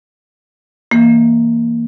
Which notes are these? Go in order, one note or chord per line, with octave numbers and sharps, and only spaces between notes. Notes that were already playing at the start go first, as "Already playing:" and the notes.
E3 A#3